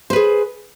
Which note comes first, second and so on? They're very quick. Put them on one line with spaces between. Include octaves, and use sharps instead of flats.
C5 B4 G#4